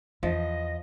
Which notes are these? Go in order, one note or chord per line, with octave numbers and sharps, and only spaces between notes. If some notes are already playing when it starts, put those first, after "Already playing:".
E2 F3 D#5